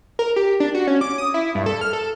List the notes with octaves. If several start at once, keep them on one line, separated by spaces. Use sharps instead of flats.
A#4
G4
D4
F#4
C#4
D6
D#6
E4
G2
A4
F6
A4